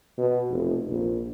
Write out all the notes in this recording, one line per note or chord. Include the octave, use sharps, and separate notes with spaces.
B2
F1
A#1